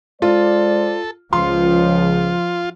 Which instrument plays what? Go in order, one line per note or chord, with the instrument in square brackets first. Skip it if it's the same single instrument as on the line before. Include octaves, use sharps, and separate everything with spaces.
[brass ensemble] G#3 C5 D5 [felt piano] F4 [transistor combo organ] A4
[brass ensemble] C#2 [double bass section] F3 [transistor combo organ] F4 [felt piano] C6